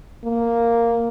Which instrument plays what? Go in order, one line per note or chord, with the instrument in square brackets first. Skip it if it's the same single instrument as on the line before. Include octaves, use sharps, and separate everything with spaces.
[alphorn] A#3